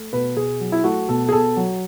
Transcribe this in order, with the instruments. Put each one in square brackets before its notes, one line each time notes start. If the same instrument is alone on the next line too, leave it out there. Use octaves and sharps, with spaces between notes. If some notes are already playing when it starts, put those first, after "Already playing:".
Already playing: [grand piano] A3
B2 B4
B2 G#4
F#3
E4
A3 F#4
B2 A4
G#4
B2 A4
F#3